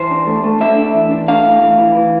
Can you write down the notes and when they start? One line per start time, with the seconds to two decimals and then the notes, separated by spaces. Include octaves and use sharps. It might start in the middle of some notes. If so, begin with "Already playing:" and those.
Already playing: E3 C5
0.11 D4
0.27 A3
0.44 A3
0.61 D4 E5
0.78 D4
0.94 E3
1.11 D4
1.28 A3 F5
1.45 A2
1.62 E3
1.79 E3
1.95 E3